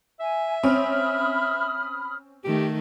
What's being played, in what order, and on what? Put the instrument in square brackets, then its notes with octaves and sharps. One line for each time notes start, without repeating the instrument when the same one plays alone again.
[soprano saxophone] E5 [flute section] G#5
[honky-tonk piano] C4 C#4 [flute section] B5 D#6 F6
[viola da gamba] D#3 A3 [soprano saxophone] G4